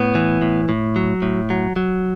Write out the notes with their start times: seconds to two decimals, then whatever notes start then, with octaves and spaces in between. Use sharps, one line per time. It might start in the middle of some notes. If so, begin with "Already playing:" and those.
Already playing: A2 B3
0.15 E3
0.42 A2
0.69 A2
0.96 F#3
1.22 A2
1.50 F#3
1.76 F#3